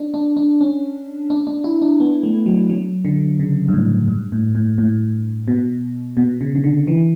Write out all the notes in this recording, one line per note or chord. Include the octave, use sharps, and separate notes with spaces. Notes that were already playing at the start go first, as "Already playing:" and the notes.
Already playing: D4
D4
D4
C#4
D4
D4
E4
D4
B3
A3
F#3
F#3
D3
C#3
G2
A2
G2
A2
A2
A2
B2
B2
C#3
C#3
D3
E3